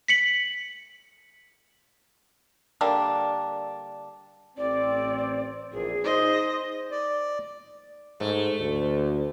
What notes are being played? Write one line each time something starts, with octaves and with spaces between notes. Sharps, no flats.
B6 C#7 F#7
D3 G3 A#3 D4
A1 C4 D5
A#1 E2 G#4
D#4 C5 D#5
D5
G#2 A3
D2